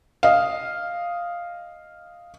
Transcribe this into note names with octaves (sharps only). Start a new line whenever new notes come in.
D#5 F5